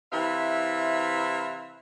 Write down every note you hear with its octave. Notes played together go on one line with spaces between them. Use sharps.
C3 E3 E4 C5 E5 F5